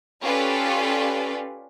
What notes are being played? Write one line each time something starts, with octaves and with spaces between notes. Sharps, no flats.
C#4 F4 G4 A4 B4 D5